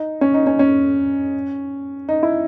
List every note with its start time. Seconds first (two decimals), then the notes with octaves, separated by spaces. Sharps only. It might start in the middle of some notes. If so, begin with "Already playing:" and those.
Already playing: D#4
0.21 C#4
0.34 D#4
0.47 C#4
0.59 C#4
2.09 D#4
2.23 E4